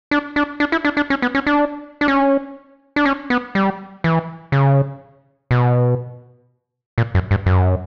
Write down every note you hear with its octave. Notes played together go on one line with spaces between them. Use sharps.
D4
D4
D4
E4
D4
D4
C#4
B3
C#4
D4
D4
C#4
D4
C#4
B3
G3
E3
C#3
B2
A#2
F#2
G2
F#2